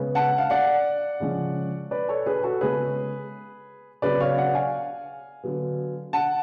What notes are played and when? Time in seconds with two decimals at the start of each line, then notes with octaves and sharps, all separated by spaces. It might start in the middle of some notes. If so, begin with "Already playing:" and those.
Already playing: C#3 G#3 B3
0.15 F#5 A5
0.38 F5
0.50 D5 F#5
1.20 C#3 F3 G#3 C#4
1.91 B4 D5
2.09 A4 C#5
2.26 G#4 B4
2.44 F#4 A4
2.61 C#3 G#3 B3 G#4 B4
4.02 C#3 F#3 B3 B4 D5
4.20 C#5 F5
4.38 D5 F#5
4.55 F5 G#5
5.44 D3 F#3 B3
6.13 F#5 A5